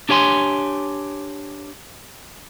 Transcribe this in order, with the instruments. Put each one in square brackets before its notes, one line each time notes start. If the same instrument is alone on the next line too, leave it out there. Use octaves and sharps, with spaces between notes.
[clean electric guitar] D4 G4 C#5 G#5 C6